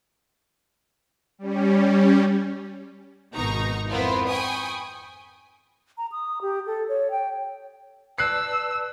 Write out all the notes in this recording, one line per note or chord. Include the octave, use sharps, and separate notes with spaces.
G3 C#4
G#1 B2 D#4 A#5 C#6
F2 B3 E4 F4 A#4 C5
G5 G#5 B5 C#6 D#6
A#5
D#6
G4
A4
C#5
G5
B4 D5 A5 E6 F#6 C7